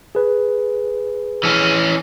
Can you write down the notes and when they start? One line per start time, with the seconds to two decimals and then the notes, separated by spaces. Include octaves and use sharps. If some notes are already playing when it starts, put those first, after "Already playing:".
0.15 G#4 B4
1.43 E3 C#4